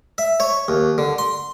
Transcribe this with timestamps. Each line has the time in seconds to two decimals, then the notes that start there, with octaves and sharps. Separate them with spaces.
0.18 E5
0.40 C#5
0.68 D#2
0.98 D3
1.18 C6